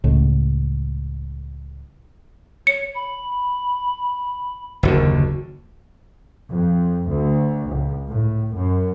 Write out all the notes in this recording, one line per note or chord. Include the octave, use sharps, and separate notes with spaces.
C#2 A2
C#5 C#7
B5
F#1 D#2 D3 F#4
F2
D2
C#2
A2
F#2